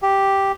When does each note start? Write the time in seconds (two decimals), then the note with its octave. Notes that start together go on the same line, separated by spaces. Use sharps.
0.02 G4